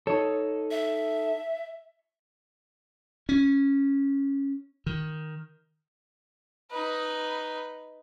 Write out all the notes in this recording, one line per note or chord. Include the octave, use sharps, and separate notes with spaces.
D#4 A4 C#5
E5
C#4
D#3
D#4 B4